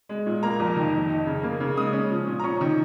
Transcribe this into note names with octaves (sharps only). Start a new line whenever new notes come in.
G#3
A#2
A#3 A#5
F2
D#3
F2
D#4
C#3
A#3
C#3
G#3 D#6
C#4
F3
A#2
A#5
C#4 C#6
D#3